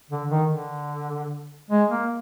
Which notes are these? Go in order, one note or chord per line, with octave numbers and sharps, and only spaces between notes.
D3
D#3
D3
G#3
A#3